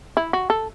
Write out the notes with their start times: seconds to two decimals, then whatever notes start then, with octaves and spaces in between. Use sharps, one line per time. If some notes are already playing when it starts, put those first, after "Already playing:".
0.17 E4
0.33 F#4
0.50 A4